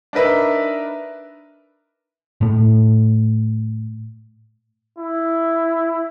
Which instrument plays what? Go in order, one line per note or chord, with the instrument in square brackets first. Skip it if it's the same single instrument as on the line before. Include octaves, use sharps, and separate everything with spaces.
[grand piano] D4 D#4 A#4 B4 E5
[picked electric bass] A2 A3
[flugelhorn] E4